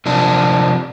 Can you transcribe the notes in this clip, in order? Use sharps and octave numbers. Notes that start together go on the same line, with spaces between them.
C3 F3 D4